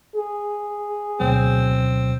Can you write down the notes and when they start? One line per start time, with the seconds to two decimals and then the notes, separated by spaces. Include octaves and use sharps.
0.16 G#4
1.20 D2 B2 F#3 C4